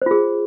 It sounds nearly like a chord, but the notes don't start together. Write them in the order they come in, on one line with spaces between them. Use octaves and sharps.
C5 F4 G#4